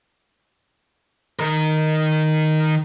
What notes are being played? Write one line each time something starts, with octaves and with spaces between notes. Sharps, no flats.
D#3 A#4